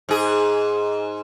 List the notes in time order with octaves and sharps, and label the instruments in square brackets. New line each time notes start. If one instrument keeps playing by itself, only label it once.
[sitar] G#2 G#4